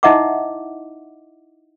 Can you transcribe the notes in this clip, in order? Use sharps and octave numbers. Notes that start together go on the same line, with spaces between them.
D#4 E4 D#5 E5 F#5 D6